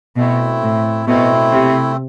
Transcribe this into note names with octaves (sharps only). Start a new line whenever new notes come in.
B2 A3 C4 E4
A2
B2 A3 C4 E4
C3